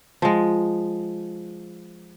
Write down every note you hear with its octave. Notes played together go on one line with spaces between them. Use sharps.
F3 G#3